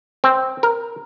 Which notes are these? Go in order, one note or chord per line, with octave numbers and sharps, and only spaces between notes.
C4
A#4